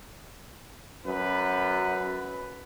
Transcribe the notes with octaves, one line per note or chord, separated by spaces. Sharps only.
F#2 B4